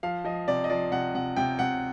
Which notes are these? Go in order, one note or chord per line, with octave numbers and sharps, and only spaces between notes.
F3 F5
F3 D#5
C3 D5
D#5
F3 D5
C3 F#5
C3 F#5
C3 G5
C3 F#5